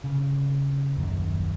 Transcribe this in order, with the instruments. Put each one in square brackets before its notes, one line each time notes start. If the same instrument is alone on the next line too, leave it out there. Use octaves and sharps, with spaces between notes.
[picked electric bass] C#3
D#1 A#1 F#2 D#3